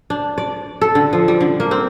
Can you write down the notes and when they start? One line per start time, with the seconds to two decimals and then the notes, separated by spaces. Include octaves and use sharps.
0.10 D4
0.38 D5
0.81 A4
0.95 D3
1.13 F3
1.28 G3
1.41 D3
1.60 A#3
1.71 C4